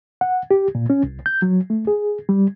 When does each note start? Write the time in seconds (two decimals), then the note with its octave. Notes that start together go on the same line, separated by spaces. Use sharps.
0.21 F#5
0.51 G4
0.75 A#2
0.90 C#4
1.03 C2
1.26 G6
1.42 F#3
1.70 A3
1.87 G#4
2.29 G3